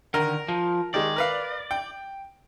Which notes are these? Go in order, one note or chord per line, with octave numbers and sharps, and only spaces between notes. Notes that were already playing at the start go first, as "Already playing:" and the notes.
D3 D#3 A#4
F3
D#3 G#3 D5
A#4 B4 F5
G5